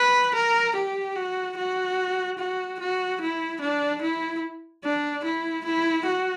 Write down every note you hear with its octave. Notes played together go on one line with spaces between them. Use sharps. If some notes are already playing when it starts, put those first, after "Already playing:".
Already playing: B4
A#4
G4
F#4
F#4
F#4
F#4
E4
D4
E4
D4
E4
E4
F#4